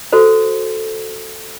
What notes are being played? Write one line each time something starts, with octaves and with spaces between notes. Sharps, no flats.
F#4 A4 C5